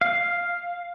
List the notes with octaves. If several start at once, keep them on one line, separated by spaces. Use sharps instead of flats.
F5